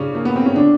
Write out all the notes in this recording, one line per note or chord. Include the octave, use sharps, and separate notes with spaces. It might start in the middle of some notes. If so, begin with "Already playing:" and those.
Already playing: C#3 C#4 D4
A#3
B3
C4
C#4
D3 D4